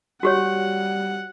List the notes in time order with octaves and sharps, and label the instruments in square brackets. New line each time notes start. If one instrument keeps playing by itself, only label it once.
[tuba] G3 [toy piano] F#4 G4 C#5 [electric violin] F#5